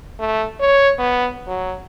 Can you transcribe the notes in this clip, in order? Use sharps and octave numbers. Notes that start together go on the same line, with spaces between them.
A3
C#5
B3
F#3